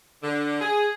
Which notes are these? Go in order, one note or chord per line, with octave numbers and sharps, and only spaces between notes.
D3
G#4